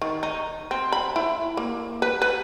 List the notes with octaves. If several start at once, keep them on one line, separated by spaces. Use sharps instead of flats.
D#3
D#4
C4
B5
E4
A#3
B4
B4